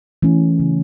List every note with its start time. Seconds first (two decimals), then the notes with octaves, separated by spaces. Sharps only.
0.23 E3 A3 C#4
0.60 C#3